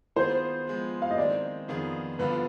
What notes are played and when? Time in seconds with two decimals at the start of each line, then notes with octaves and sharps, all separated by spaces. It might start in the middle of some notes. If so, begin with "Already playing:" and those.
0.16 D#3 B3 F4 G#4 C5
0.67 F3 G#3 B3
1.02 F5
1.10 D#5
1.17 D#3 G#3 C4 D5
1.68 F2 D#3 B3 F4 G#4
2.19 G2 D3 F3 B3 F4 B4